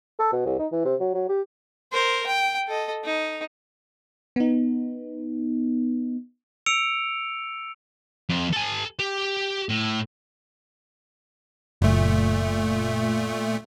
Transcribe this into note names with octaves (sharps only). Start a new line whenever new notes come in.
A4
B2
C2
D#4
E3
C3
F#3
F#3
G4
A#4 C5
G5
A4 D#5
D#4
B3 D#4
E6 C#7 D7 F7
F2
A4 G#5
G4
A2
F#1 A#2 A3